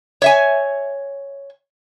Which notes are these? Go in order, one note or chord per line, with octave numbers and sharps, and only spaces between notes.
C#5 E5 G#5